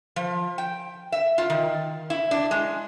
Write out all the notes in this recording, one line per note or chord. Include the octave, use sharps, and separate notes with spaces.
F3
G5
E5
F4
D#3
E4
D4
G#3